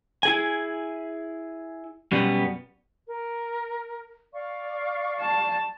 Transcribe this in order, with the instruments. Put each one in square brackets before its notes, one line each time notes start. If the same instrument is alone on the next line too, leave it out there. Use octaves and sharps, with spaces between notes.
[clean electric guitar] E4 G#4 G#5
F#2 B2 G3 B3
[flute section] A#4
D5 F5 C#6
[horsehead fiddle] A5